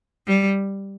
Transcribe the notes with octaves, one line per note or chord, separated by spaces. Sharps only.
G3